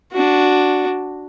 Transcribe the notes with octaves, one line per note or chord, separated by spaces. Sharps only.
D4 F#4